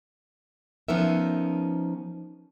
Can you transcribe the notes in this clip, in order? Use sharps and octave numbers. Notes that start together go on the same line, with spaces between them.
F3 B3 C#4 D#4 A#4 E5